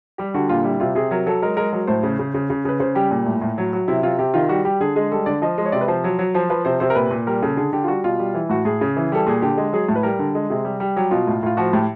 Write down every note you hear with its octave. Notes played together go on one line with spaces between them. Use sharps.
G3 G4
D3 F#4
A#2 F4
G3 E4
C3 F4
C3 G#4
F#3 A#4
F#3 A4
G#3 A#4
G#3 A#4
F#3 A#4
A2 C5
C#3
C#3
C#3
C#3
C#3 B4
C#3 C5
G3 G4
A#2
A2
A2
F#3
F#3
C3 E4
C3 F4
C3 G4
D#3 F4
G3 F#4
G3 G4
D3 G#4
G#3 G#4
G3 A4
D3 D5
F3 D#5
G#3
C#5
C3 D5
B4
F3 C5
F#3
F#3
F3 C5
F3 B4
C3 C5
C3 C5
A#4
A#2 B4
A#2
G3 A#4
C#3 A4
D3 G#4
D3 G4
F4
G3 F#4
B2 F4
G3
E3
A2 F#4
A2 G#4
C#3
E3
G3 A4
A#2 G#4
D3 G4
G#3
F#3 G#4
A2
B4
G3 A#4
D3
G#3
C3 G#4
G3
G3
F#3 G4
B2 F4
A2
A2 F4
F3 F#4
A2 G4